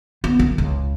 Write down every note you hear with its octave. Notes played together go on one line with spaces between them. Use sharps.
B3
D#3
C#2